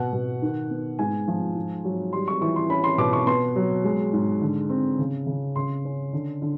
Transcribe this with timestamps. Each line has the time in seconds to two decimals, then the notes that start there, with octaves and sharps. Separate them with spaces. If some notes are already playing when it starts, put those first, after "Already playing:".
Already playing: B2 F#5
0.13 B2
0.42 D#3
0.71 B3
0.99 G#2 G#5
1.28 F3
1.56 G#2
1.85 F#3
2.13 G3 C6
2.28 C#6
2.41 E3 C#6
2.56 C6
2.70 C#4 B5
2.84 C6
2.98 B2 D6
3.13 C#6
3.27 B3 C6
3.56 F#3
3.84 G#3
4.13 G#2
4.42 D3
4.69 C4
4.99 C#3
5.26 C#3
5.56 C#3 C6
5.85 C#4
6.13 D3
6.42 D3